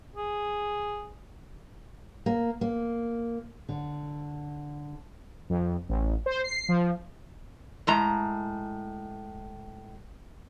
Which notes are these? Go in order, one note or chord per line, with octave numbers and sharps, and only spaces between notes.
G#4
A#3
A#3
D3
F2
A1
C5
C7
F3
A2 G#3 A#5